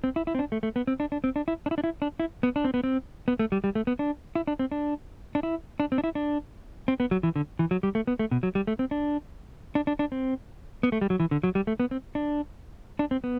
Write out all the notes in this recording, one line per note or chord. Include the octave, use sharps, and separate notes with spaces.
C4
E4
E4
C4
D4
A3
A3
B3
C4
D4
D4
C4
D4
E4
D4
E4
D4
E4
D4
E4
B3
D4
C4
B3
C4
B3
A3
G3
G3
A3
B3
D4
E4
D4
C4
D4
D4
E4
D4
C4
D4
E4
D4
C4
B3
F#3
E3
D3
E3
F#3
G3
A3
B3
A3
B2
F#3
G3
A3
C4
D4
D4
D4
D4
C4
B3
A3
G3
F#3
E3
D3
F#3
G3
A3
B3
C4
D4
D4
C4
B3